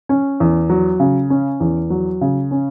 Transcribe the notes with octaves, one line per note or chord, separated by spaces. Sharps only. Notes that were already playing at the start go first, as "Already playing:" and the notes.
C#4
E2
F#3
C#3
C#4
E2
F#3
C#3
C#4